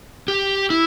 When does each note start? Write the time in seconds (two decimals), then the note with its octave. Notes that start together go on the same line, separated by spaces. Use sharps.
0.28 G4
0.70 E4